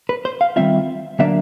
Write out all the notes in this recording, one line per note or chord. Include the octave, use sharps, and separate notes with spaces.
B4
C5
F5
D#3 G3 C4 F4 E5
D3 F#3 A#3 D4 E5